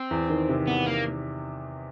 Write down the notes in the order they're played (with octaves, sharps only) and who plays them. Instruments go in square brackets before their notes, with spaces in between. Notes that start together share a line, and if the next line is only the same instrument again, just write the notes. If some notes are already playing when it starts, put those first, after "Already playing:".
Already playing: [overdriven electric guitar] C4
[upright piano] E2
D#3
C3
[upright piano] E2 [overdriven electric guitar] B3
[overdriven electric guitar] A#3